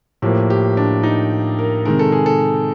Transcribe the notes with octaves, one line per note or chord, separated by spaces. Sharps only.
A2 F3 A#3 G4
G4
D4
D#4
A#4
C3 D#3 G#3 A#4
A4
G#4
A4